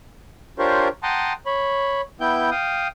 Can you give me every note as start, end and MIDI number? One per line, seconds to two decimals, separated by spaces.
0.59 0.88 62
0.59 0.88 65
0.59 0.88 67
0.59 0.88 70
0.59 0.88 72
0.59 0.88 73
1.03 1.33 78
1.03 1.33 79
1.03 1.33 81
1.03 1.33 82
1.03 1.33 84
1.03 1.33 87
1.46 2.01 73
1.46 2.01 83
2.20 2.50 59
2.20 2.50 64
2.20 2.50 79
2.20 2.50 91
2.51 2.88 77
2.51 2.88 79
2.51 2.88 87